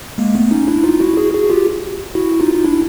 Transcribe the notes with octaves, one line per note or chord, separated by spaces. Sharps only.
G#3 A#3
A3 B3
C#4 D#4
D4 E4
D#4 F4
E4 F#4
F#4 G#4
F#4 G#4
F4 G4
E4 F#4
D#4 F4
D#4
D4 E4